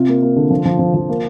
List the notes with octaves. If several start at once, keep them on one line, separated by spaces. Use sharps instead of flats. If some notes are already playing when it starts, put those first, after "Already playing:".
Already playing: C3 F4
A#3
A#3
D3
F3
F3
F3
F3
A#3